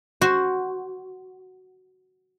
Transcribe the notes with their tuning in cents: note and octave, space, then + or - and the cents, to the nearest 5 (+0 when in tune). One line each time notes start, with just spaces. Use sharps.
F#4 +5 C5 +0